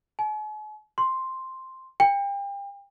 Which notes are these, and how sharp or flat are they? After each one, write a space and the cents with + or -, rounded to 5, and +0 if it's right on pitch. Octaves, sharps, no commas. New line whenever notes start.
G#5 +45
C6 +5
G5 +35